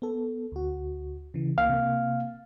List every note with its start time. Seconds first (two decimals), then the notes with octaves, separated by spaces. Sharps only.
0.02 B3 A4
0.52 D2 F#4
1.34 C#3 E3
1.58 C#2 A#3 F5
1.69 C3 A#3